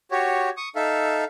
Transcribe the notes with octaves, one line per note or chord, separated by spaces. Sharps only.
F#4 G4 C#5
C#6 D#6
D#4 A4 E5 F5